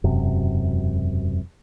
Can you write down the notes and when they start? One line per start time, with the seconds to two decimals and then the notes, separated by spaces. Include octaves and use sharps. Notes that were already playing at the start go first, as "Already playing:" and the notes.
0.04 E1 F#2 C3